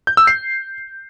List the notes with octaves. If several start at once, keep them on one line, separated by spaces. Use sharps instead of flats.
G6
E6
C7